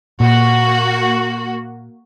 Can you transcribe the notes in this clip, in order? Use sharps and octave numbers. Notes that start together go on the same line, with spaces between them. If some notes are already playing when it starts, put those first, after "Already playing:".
A#2 A#3 F#4